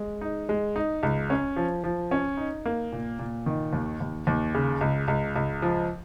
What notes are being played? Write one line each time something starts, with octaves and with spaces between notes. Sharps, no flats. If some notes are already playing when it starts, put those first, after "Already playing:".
Already playing: G#3
D#4
G#3
D#4
C#2
C#4
F3
F3
C#4
D#4
A#3
A#2
A#2
D#3
D#2
D#2
D#2
C#3
C#2
C#2
C#2
F3